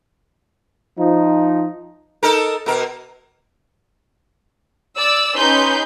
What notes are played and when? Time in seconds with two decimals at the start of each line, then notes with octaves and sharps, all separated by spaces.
0.98 F3 D#4
2.23 D#4 A4 A#4
2.66 B2 A#4
4.96 D5 E6
5.35 C#4 D#4 G4 B4 C6 G6